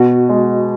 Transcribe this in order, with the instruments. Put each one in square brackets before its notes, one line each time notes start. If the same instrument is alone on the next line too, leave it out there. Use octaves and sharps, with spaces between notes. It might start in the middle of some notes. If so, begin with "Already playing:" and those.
Already playing: [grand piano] B2 [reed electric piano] F#4
[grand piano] G#3